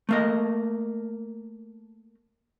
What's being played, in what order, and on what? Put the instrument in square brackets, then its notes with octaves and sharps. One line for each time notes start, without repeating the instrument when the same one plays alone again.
[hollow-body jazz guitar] A3 A#3 D#5